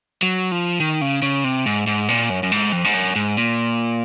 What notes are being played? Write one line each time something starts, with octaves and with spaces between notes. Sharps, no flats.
F#3
F3
D#3
C#3
C#3
C3
G#2
G#2
A#2
F#2
F#2
G#2
F2
G#2
F#2
G#2
A#2